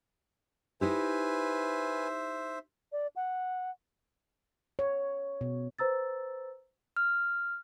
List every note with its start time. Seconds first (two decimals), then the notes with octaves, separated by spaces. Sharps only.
0.81 D#4 E4 G4 B4 C5 E5 G#5
2.92 D5
3.16 F#5
4.79 C#5
5.41 B2
5.79 B4 C5 A#5 E6 A6
6.97 F6